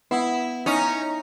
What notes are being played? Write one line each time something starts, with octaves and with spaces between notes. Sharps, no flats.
B3 E4 F#5 B5 D#6
C#4 D#4 A#5